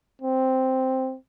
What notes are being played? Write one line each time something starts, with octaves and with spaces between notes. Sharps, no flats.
C4